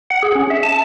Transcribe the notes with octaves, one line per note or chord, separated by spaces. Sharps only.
F#5
G#4
C#4
E5
A5